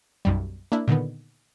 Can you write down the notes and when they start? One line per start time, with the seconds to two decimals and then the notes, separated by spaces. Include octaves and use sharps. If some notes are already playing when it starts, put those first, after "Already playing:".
0.25 B1 F#2 G3
0.72 A#3 D4 E4
0.88 A#2 D3 D#3 B3